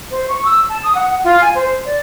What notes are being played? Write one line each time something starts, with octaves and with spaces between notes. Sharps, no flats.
C5
C#6
E6
A5
D#6
F#5
F4
G#5
C5
D5